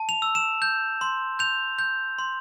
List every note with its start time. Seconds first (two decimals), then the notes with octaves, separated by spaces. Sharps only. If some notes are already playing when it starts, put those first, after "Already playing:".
Already playing: A5
0.09 F7
0.22 E6
0.35 E7
0.62 G6
1.01 C6
1.39 G6 F7
1.79 G6
2.18 C6